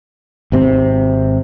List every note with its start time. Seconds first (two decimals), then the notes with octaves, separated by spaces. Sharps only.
0.52 G#1 C3 C4